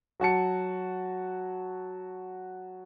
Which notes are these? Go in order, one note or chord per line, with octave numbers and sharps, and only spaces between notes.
F#3 F#4 A5 C#7